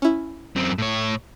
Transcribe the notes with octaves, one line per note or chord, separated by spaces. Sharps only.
C#4 E4
F#2 C4
A2 C#5